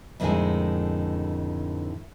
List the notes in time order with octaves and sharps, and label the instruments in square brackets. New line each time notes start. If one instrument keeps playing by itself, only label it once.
[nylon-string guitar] F2 A2 D3 D#3 G#3 G#5